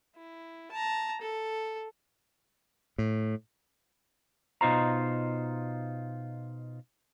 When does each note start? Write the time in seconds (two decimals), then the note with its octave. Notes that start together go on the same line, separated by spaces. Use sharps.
0.16 E4
0.72 A5 A#5
1.21 A4
2.98 A2
4.61 B2 D#4 F4 C5 A#5